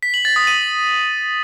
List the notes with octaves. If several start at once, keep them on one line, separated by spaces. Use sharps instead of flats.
B6
F#7
A6
D#6
D#7